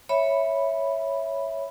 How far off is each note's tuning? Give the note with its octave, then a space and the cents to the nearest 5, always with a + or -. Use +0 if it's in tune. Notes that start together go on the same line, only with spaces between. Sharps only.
C#5 +0 E5 +0 B5 +0